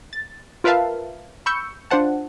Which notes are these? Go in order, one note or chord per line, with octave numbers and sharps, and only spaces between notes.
A6
F4 A#4 B4 E5 F5 A5
B5 C#6 E6 G6 C#7
D4 F4 C5 F#5 A5